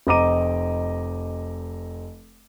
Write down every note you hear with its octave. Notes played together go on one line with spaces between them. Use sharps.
F1 C4 D#5 A#5 D6 D#7